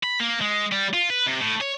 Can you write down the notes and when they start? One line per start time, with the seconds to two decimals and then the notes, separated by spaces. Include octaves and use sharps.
0.04 B5
0.20 A#3
0.41 G#3
0.72 G3
0.94 F4
1.10 B4
1.26 C3
1.41 A2
1.61 C#5